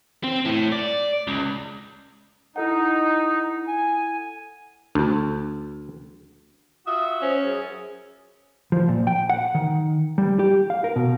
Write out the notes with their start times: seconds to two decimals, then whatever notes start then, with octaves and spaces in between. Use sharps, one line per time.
0.24 C4
0.46 A2
0.72 D5
1.27 C#2
2.56 D#4 E4 A4 F#5
3.68 G#5
4.95 D2
6.86 F4 F#4 E5 D#6
7.22 C#4 C5
7.44 F#2 G#4
8.72 F3
8.89 A#2
9.07 G5
9.30 F#5
9.55 D#3
10.18 G3
10.39 G4
10.70 F5
10.84 A#4
10.96 B2